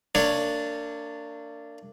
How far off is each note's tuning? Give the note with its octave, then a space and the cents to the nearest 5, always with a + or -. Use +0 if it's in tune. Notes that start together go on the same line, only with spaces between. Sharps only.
A#3 -35 D4 -5 C#5 +0